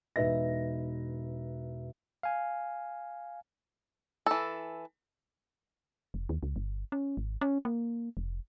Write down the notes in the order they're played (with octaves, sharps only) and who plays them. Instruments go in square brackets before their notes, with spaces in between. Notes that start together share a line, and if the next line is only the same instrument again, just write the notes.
[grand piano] E1 D#4 B4 E5 A#6
[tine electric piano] F5 G#5
[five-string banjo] E3 A4
[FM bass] F1
D#2
C#2
G1
C#4
G#1
C#4
A#3
F1